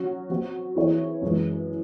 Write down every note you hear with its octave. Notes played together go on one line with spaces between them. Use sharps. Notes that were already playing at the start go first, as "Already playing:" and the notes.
Already playing: F#3 C#4 F#4
F#3 C4 F#4
E3 C4 E4 G#4 C#5
F#2 E3 G#3